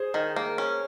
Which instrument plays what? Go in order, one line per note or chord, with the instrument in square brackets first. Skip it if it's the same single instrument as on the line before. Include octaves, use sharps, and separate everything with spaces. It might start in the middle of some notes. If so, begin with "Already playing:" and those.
Already playing: [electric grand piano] G#4 C5
[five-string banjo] D#3
A#3
C#4